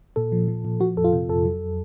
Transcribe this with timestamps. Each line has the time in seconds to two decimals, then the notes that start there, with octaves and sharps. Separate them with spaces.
0.16 A#2 A4
0.32 F3
0.48 F3
0.65 A#2
0.80 F3 F#4
0.97 F2 A4
1.04 F4
1.13 C3
1.29 F2 A4
1.45 F#3